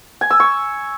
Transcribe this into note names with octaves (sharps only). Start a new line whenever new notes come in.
G#5
E6
C#6